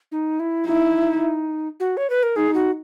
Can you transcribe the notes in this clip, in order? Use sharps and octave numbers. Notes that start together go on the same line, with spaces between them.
D#4
E4
D#4 E4
F#4
C#5
B4
A#4
D#4 G#4
F#4